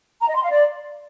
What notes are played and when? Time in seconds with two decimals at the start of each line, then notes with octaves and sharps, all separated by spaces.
0.21 A#5
0.29 D#5
0.36 C6
0.43 F5
0.51 D5